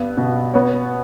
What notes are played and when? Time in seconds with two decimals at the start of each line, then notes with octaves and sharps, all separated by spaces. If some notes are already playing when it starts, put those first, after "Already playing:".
Already playing: G2 B3
0.17 B2
0.54 B3 C#5